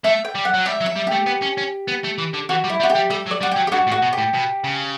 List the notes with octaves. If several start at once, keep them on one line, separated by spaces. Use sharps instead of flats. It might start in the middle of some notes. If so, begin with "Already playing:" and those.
A3 E5
G5
G3
F#5
F#3
G3 E5
F#3
E5
G3
A3 G4
B3
C#4
C#4
B3
A3
E3
D3
E3 F#4
G3
E4
G3
F#4
G4
G3
G3 A4
F#3
D5
G3 F#4
F#3 G4
G4
G2 F#4
A2
F#4
B2
G4
A2
B2
C#3